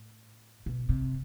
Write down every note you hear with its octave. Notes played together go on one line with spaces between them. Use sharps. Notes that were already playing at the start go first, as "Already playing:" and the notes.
Already playing: A2
B2
C3